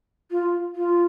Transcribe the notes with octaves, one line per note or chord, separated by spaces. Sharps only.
F4
F4